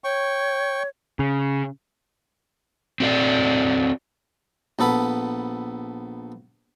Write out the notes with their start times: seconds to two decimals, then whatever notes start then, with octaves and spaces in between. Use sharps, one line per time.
0.04 C#5 G5 C#6
1.19 C#3
3.00 C4 F#4 A4 D5
4.79 A#1 B3 A4 B5